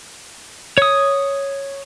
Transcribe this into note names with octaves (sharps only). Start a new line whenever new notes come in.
C#5 D#6